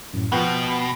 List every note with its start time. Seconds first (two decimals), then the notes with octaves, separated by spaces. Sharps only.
0.13 F#2 A2
0.32 B2 F3 B3 F#5 G5